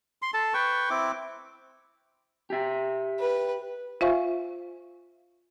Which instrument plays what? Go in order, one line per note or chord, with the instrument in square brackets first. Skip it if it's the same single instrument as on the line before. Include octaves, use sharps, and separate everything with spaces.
[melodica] C6
A4 A5
B4 G5 C#6
C4 E4 D6
[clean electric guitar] G4 E5
[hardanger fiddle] B4
[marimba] F4 C5 E5 F5 G#5 C#6